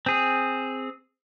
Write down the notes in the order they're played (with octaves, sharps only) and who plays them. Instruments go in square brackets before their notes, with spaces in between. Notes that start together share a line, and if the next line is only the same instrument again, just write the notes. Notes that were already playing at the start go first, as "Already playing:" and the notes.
[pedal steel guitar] C4 G#4